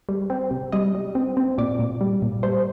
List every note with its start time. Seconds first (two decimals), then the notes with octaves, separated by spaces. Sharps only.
0.09 G3
0.30 C4
0.51 C3
0.72 G3 D#5
0.95 G3
1.15 C4
1.37 C4
1.58 A#2 D5
1.79 A#2
2.01 G3
2.22 A#2
2.43 G3 C5